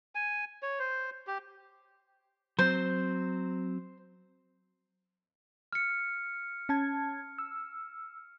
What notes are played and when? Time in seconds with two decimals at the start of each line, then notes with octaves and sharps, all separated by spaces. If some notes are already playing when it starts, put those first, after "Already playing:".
0.15 G#5
0.63 C#5
0.79 C5
1.27 G4
2.59 F#3 C4 C5
5.72 F6 C#7
6.69 C#4 A5 G#6
7.38 E6